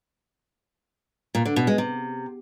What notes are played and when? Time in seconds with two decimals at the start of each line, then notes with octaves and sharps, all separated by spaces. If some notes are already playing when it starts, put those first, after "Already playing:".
1.35 A#2
1.45 D3
1.56 B2
1.67 G#3
1.78 C3